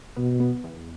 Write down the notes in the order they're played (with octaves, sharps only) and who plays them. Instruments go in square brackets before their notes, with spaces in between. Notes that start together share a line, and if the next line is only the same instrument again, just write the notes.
[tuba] B2 [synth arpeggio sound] B3
[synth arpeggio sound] B3
E2